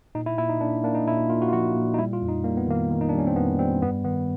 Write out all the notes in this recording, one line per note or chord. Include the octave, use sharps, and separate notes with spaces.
A#2 D#4
E4
A#2 E4
D#4
A#3 D4
A#3 D4
D#4
A#2 E4
F4
A#3 F4
F#4
F4
F3 F#4
A#2
D#4
G3 E4
F4
F2
D#4
G3 A#3
B3
D#3 A#3
D#3
D#4
D4
G3
C#4
C4
F2 B3
G3 C4
G2 B3
D#3 B3